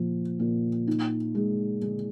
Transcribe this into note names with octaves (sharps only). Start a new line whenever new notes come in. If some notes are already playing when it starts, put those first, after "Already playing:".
Already playing: A#2 F3
A#2
D#4
G#3
G#3